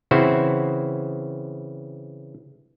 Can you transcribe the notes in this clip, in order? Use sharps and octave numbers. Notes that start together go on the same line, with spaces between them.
C#3 E3 C4 E4 F#4 C5